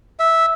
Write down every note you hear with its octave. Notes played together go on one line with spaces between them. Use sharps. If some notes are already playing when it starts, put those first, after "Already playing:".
E5